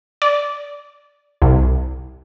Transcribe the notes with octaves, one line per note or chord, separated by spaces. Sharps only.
D5
C2